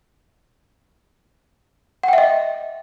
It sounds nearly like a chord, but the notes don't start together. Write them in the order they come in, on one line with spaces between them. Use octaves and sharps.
F#5 G5 E5 D#5